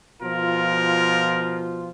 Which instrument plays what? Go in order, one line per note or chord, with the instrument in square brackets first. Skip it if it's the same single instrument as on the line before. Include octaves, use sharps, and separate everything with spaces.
[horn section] B2 F3 F4 [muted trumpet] A#4